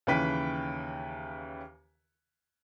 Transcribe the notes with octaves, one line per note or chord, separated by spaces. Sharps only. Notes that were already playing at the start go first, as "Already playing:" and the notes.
D#2 C#3 E3 B4 G5 B6